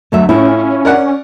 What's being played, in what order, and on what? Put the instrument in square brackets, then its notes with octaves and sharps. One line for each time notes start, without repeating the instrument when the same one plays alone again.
[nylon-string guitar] D2 F#3 E5 [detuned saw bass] A3
[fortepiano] A2 [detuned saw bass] C#4 [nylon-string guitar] E4 F4
[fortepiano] A#4 D5 F#5